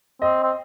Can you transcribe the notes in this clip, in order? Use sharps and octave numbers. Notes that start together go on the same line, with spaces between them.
C4 D#5
C4